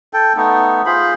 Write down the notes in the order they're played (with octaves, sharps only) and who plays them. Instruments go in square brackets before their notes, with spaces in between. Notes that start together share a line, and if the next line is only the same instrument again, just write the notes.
[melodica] A4 G5
A3 B3 D#4
F4 G#4 C5 B5